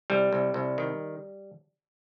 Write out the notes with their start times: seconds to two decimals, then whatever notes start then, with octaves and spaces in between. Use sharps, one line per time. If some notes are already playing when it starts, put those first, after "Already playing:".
0.10 C2 G3
0.33 C2
0.54 C2
0.78 D#3